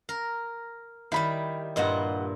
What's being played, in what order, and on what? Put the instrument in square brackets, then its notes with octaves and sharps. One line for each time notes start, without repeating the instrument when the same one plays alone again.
[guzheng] A#4
[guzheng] D#3 G3 [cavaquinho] E4 B5
[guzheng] G2 A#2 E4 [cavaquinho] D#5 F#5